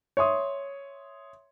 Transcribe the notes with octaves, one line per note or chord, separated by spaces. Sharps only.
C#5 E5 C6 D#6